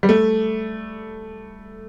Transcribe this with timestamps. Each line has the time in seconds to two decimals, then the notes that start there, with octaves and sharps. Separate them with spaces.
0.03 G3
0.09 A3